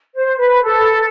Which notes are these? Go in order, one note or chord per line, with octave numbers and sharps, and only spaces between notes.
C5
B4
A4